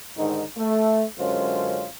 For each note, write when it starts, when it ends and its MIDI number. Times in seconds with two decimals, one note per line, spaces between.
0.17 0.43 44
0.17 0.43 50
0.17 0.43 51
0.17 0.43 63
0.57 1.05 57
1.19 1.88 42
1.19 1.88 50
1.19 1.88 56
1.19 1.88 61
1.19 1.88 65
1.19 1.88 72